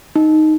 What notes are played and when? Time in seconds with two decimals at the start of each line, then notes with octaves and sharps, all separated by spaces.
0.16 D#4